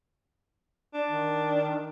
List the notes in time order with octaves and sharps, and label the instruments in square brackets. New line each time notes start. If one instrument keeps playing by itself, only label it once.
[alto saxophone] D4
[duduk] D#3